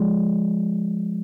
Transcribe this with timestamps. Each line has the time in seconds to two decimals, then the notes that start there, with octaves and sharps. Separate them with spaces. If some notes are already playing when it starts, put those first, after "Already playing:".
Already playing: F3 G#3